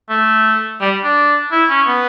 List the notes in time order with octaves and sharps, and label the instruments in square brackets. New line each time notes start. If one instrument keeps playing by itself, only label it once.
[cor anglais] A3
G3
D4
E4
C#4
B3